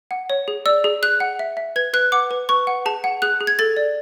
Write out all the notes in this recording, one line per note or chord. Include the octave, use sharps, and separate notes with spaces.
F#5
C#5
G#4
D5 E6
G#4
G#4 F#6
F#5
E5
E5
B4 G#6
B4 F#6
F#5 D6
B4
B4 C#6
F#5
G#4 A5
F#5
G#4 F#6
G#4
G#6
A4 A6
D5